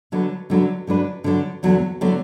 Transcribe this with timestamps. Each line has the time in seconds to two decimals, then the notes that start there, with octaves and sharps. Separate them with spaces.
0.12 D3 F#3 D4 B4
0.50 D3 F#3 D4 B4
0.87 D3 F#3 D4 B4
1.24 D3 F#3 D4 B4
1.63 E2 D3 F#3 B3
2.01 D3 F#3 B3